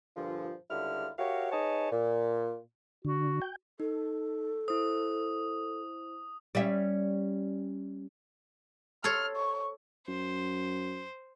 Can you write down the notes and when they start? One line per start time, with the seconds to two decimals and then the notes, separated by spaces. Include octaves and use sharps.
0.16 G2 A#2 D3 F3
0.70 C#2 D3 G3 E4 F4 F6
1.19 F#4 G4 A#4 C#5 E5 F5
1.52 D#4 G#4 B4 C#5 D#5 A5
1.91 A#2
3.05 D3 F#4
3.42 G5
3.80 D#4 A4
4.68 E4 C5 D#6
6.55 G3 C#4 E5
9.04 A4 C5 C#5 F6
9.37 C#6
10.08 F#2 C5